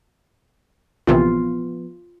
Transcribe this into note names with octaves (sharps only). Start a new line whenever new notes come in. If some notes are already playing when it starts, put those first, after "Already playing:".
A#1 C3 E3 F3 B3 F4